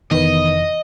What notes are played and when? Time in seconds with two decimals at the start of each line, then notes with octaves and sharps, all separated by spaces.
0.11 F1 D#3 E3 B3 B4 D#5